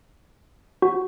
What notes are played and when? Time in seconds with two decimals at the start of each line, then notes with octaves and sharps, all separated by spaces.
0.82 F#4